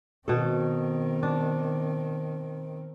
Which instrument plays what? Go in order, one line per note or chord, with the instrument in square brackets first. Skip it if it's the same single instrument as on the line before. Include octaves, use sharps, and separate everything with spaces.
[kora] B2 A4 [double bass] D#3 C4
[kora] D4